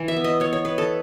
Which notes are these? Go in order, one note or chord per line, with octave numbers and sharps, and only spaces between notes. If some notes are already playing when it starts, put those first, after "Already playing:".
Already playing: E3
E5
B3
D#5
B3 C#5
C#5
B3 B4
A4